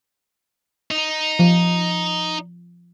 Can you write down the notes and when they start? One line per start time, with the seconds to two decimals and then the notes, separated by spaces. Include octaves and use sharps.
0.91 D#4
1.39 F3